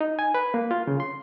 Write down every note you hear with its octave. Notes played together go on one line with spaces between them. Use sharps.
D#4
G#5
B4
A#3
F4
C#3
C6